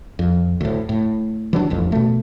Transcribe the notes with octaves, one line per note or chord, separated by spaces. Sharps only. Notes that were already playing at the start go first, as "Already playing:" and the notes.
F2
D2 A2
A2
E3 F#3 D4
D#1 A1 F2
B2 A3